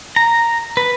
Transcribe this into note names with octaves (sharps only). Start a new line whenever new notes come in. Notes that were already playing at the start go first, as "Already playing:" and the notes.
A#5
B4